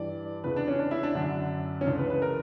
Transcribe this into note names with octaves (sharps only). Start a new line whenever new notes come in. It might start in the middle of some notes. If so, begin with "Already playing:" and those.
Already playing: G2 E3 D5
E2 C#3 E3 B4
D4
C#4
D4
E4
D4
F#2 D3 D4
C#4
C#2 C#3 E3 D4
B4
B4
A#4